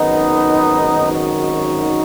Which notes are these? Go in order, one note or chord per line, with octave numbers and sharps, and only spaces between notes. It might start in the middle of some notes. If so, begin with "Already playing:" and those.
Already playing: G#1 F#2 D#3 B3 D#4
D#4 F#4